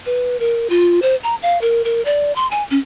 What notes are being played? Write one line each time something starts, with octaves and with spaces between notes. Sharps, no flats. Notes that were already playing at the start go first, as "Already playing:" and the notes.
B4
A#4
F4
C5
A#5
F5
A#4
A#4
D5
C6
G#5
C#4